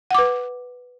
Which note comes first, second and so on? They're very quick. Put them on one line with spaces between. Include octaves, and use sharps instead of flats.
F#5 D6 B4